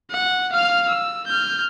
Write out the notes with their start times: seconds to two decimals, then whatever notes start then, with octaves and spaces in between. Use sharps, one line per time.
0.12 F#5
0.53 F5 F6
0.89 E6
1.27 F6 G6